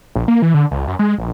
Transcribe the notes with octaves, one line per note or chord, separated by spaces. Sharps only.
A#1
A#3
E3
D3
C#2
F#2
G#3
A#1